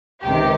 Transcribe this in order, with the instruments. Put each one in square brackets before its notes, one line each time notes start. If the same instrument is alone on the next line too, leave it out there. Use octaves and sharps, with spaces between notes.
[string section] C#2 C3 D#3 G4